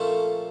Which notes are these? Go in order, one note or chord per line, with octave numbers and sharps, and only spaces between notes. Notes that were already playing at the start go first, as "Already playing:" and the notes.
Already playing: A#2 F3 A3 C#4 A4